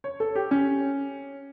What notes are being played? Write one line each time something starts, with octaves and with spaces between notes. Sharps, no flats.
C#5
A4
G4
C#4